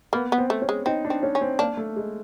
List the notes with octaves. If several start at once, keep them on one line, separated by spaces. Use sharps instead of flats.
A#3 B3
B3
C4
A3
C#4
G#3
C4 D#4
D4
C4
C#4
C#4
C4
A#3 D4
A3
G#3